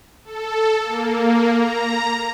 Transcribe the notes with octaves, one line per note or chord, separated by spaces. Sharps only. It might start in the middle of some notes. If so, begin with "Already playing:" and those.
A4
A#3
A#5